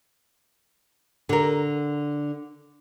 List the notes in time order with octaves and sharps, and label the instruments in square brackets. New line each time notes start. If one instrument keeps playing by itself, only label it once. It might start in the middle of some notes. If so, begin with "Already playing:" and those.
[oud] D3 A#4